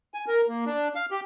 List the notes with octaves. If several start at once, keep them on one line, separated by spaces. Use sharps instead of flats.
G#5
A#4
A#3
D4
F5
G4